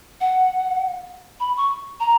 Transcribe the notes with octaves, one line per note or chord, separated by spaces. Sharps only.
F#5
B5
C#6
A#5